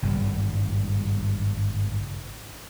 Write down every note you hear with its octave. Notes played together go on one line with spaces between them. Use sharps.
G#1 G2 C#3 G3